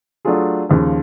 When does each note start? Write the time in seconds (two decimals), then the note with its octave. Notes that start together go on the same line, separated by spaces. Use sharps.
0.25 F#3 A3 D4 F4 G#4
0.69 D#2 C#3 F3